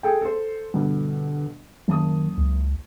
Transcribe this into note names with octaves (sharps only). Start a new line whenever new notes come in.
G#4 A4 G5
A4 C5
G2 B2 D3
F#1 D#3 A5 D#6
C#2